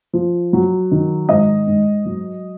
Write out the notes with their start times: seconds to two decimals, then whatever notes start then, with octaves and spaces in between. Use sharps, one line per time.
0.13 F3
0.53 F#3
0.91 D#3
1.29 G#2 D#5
1.67 G#2
2.06 F#3